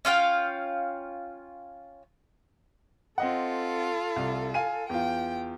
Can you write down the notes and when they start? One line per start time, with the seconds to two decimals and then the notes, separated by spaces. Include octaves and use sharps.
0.05 C#4 F4 F5 G5
3.18 C4 F4 A4 D#5 F#5
4.16 C2
4.54 F5 G#5 D#7
4.90 E2 F4 G5